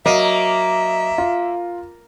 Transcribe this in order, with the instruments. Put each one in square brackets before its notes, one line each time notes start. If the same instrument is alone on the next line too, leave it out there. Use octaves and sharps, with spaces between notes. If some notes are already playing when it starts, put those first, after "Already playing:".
[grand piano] F#3 D#5 D#7 [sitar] A#3 [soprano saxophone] E5
[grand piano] F4